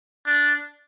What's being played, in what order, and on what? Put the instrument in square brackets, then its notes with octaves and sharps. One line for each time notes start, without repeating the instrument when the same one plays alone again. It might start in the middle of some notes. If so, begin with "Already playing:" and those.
[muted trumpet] D4